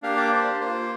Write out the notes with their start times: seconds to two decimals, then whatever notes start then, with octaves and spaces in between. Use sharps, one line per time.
0.03 A#3 D4 G4 F5
0.17 D5
0.33 C5
0.60 A#3 C5
0.66 F4